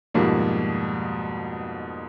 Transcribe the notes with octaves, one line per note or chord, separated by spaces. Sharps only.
F2 G#2 B2 F3 G3 A#3